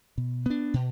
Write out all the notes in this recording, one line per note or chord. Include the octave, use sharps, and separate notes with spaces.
B2
B3 D4
B2